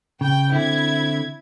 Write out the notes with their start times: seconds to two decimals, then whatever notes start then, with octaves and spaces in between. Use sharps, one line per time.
0.21 C#3 G5
0.52 D3 C4 E4 G#6